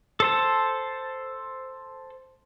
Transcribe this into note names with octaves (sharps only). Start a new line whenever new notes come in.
A4 C5 A5